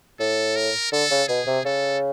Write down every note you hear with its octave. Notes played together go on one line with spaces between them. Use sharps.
A2 A4
A#4
D3 A4
C#3
B2 G#4
C3
C#3 A4